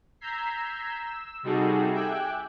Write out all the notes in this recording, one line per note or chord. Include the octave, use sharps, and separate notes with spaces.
A#5 E6 G6 G#6 B6 C7
E6
C3 G3 D#4 F#4 G#4 A4
E5 G5 G#5 D6 F#6